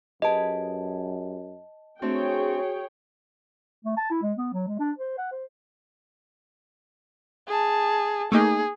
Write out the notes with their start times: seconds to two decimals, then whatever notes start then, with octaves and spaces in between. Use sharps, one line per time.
0.22 F#2 G4 G#4 B4 D#5 A5
2.02 A3 C4 D4 F#4 G#4 C#5 G5
3.85 A3
3.97 A5
4.10 E4
4.22 G#3
4.38 B3
4.53 F#3
4.68 G#3
4.79 D4
4.98 C5
5.18 F#5
5.32 C5
7.48 G#4 A5
8.32 A3 A#3 D#4 G#4